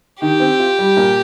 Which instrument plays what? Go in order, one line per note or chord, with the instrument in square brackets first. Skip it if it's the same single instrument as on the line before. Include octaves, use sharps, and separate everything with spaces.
[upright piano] D#3 [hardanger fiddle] G4
[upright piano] C4
F4
G3
A#2